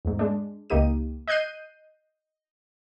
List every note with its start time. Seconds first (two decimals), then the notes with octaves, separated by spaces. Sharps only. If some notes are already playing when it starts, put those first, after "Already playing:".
0.05 E2 G#2
0.19 G#3 D4
0.70 C#2 A#3 D#4 G4 D#7
1.28 D#5 F#6 G6 C7 D#7